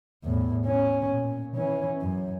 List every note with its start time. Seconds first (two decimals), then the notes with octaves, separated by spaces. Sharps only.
0.24 E2 A2
0.66 C#4
1.10 A#2
1.56 E3 C#4
2.01 F#2